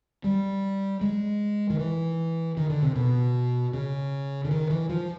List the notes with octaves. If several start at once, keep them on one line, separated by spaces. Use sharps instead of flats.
G3
G#3
D#3
E3
D#3
D3
C3
B2
C#3
D3
D#3
E3
F3